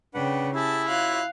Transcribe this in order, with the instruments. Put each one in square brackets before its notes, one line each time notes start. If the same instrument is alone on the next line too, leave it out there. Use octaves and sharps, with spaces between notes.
[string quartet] C#3 G5 [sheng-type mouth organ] D4 B4 F#5
[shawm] E4 [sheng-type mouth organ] G4 G#4 [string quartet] A5
[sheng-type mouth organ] F4 F#4 C#5 [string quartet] F5 F#6